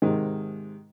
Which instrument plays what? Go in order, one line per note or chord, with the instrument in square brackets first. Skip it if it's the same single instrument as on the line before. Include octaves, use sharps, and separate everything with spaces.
[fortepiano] G#2 C3 D#3 G#3